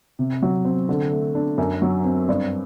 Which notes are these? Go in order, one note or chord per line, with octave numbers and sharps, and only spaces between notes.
C3
F#3
C4
D3
A3
D4
F#2
F#3
C4
G2